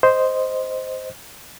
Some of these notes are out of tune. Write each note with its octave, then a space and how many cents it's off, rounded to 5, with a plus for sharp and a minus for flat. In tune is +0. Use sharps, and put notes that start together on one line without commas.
C5 -5 D#5 +0